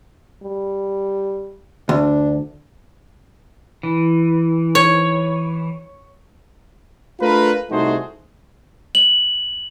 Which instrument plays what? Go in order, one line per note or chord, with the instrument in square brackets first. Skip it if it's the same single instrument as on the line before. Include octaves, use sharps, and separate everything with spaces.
[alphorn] G3
[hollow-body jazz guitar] D2 [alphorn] D4
[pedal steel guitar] E3
[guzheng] C#5
[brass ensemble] A3 D4 F4 A#4 B4
C2 A3 D#4 F#4 G#4 C5
[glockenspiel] F#7